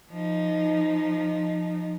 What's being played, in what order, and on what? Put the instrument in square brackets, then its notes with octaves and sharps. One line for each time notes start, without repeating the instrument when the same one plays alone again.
[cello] F3 D#4